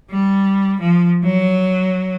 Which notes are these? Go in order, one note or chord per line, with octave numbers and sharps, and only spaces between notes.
G3
F3
F#3